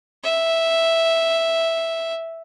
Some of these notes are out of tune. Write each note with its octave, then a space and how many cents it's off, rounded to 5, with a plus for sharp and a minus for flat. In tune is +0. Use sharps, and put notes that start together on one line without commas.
E5 +0